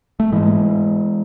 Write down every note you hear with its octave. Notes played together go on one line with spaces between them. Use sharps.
A3
G#2 E3 G#3